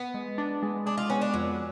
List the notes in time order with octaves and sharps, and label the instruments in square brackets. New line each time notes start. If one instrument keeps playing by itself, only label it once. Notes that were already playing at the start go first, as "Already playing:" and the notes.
Already playing: [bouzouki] B3
[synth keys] G#3
D4
G#3
[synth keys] G#3 [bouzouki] D4
[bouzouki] F4
[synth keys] B3 [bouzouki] C#4
[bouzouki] D4
[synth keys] F2 [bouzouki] F#3